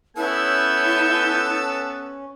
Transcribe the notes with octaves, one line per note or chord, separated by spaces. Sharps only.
B3 C#4 E4 A4 G6